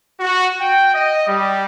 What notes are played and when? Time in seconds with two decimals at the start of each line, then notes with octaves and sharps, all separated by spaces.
0.20 F#4
0.60 G5
0.94 D#5
1.27 G3